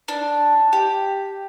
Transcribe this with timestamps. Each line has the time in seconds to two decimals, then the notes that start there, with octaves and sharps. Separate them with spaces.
0.08 D4
0.73 G4